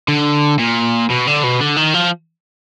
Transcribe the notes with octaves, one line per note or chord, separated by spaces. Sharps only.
D3
A#2
B2
D3
B2
D3
D#3
F3